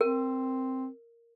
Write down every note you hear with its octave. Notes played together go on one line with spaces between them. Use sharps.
C4 A#4